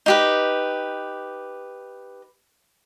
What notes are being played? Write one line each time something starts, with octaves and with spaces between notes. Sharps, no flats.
D#4 G4 B4